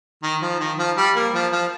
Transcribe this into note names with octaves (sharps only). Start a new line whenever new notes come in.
D#3
F3
D#3
F3
G3
A#3
F3
F3